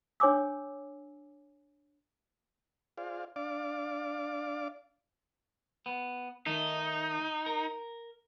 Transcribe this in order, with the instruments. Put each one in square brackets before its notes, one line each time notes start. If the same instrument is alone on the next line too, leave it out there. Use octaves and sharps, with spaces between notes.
[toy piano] D4 C#5 G#5 D6 E6
[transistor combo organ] F4 G#4 C5 D5 F5
D4 D5 F5 D6
[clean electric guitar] B3
[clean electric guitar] D#3 A3 [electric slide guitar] D#4
[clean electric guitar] A#4